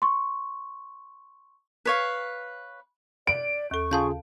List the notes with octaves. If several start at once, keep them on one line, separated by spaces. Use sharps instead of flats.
C6 C#6
B4 C#5 F5
D5 D7
D#2 A4 C#6
C#3 F4 G#4 F5 A5 G6